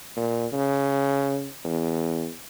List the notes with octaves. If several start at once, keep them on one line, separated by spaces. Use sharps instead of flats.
A#2
C#3
E2